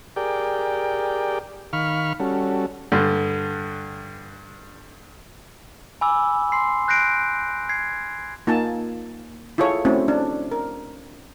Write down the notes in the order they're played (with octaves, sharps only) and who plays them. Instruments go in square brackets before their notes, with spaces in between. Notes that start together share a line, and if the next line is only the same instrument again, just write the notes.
[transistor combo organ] G4 G#4 A#4 D5 G5
D#3 F5 B5 C#6 F6
G3 C#4 F#4 A4
[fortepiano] G2 D3
[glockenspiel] G#5 B5 D6 E6
C6 C7
F#6 G6 A#6 C7 D7
G#6 C7
[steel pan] A#3 D#4 F4 G#5 A5
E4 F4 G#4 A4 C#5
A3 C4 C#4 E4 F#4
D4
A#4